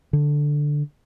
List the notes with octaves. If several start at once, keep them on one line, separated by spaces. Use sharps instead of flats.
D3